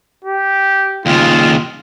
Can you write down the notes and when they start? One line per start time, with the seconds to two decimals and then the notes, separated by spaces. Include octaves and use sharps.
0.25 G4
1.06 D#2 C#3 F4